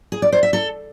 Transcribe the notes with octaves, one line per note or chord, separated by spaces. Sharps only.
G#4
D5
C5
E5
A4